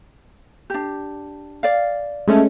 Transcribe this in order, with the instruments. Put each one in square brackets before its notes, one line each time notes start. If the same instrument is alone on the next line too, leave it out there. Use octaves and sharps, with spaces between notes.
[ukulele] D4 G4
D5 F5
[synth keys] G#3 A3 C#4